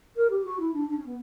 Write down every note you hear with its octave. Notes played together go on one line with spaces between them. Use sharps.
A#4
G4
F#4
E4
D4
D4
C#4
B3